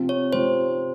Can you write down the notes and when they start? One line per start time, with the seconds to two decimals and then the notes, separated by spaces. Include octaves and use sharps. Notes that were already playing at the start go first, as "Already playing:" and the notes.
Already playing: C3 F3 C4
0.09 C#5
0.33 C3 F3 C4 C5